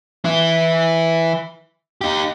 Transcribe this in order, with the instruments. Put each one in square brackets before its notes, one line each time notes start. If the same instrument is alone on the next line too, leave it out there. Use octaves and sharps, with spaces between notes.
[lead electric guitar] E3 E4
D#4 G4